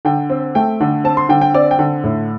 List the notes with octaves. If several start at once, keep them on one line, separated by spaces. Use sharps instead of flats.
D3 G5
C4
A3 G5
D3
C4 A5
C6
D3 G5
G5
C4 D5
G5
D3
A2